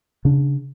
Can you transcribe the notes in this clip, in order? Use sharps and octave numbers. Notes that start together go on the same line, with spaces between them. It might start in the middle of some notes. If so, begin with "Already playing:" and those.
C#3 D4